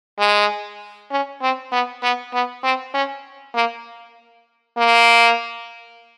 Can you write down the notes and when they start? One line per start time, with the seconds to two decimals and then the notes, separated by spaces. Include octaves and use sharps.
0.19 G#3
1.11 C#4
1.42 C4
1.72 B3
2.03 B3
2.33 B3
2.63 C4
2.94 C#4
3.55 A#3
4.78 A#3